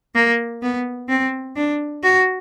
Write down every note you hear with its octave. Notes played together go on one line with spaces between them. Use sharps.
A#3
B3
C4
D4
F#4